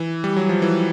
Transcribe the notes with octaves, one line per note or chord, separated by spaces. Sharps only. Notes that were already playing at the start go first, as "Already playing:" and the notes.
Already playing: E3
G3
F#3
F3
E3